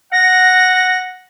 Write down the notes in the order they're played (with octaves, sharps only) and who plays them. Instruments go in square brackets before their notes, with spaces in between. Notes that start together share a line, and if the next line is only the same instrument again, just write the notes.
[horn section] F#5 [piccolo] A#6